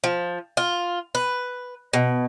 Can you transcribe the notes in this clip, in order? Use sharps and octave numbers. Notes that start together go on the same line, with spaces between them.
F3
F4
B4
B2